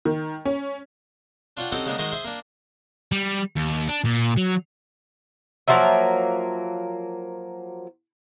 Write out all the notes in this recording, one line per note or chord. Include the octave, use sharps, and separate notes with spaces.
D#3
C#4
D4 F4 C#5 D5 F#5 G5
C4 C#4 D#4 F#4 G4 A4
C#3 G#3 A#3 B3 D4
D#3 G#3 F#4 A#4 C5 D#5
G#4 C5 E5
A#3 D4
G3
D#2
D4
A#2
F#3
F3 F#3 A#3 E5